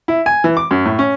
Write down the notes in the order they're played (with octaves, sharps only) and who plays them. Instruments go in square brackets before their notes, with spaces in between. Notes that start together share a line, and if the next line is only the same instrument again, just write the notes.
[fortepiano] E4
G#5
E3
D6
F#2
A2
C#4